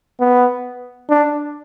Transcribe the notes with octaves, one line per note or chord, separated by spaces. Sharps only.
B3
D4